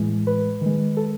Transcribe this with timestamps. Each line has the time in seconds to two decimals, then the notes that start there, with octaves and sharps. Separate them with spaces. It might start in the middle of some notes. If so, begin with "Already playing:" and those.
Already playing: A2 E3 G#3
0.27 B4
0.61 D#3 G#3
0.97 A4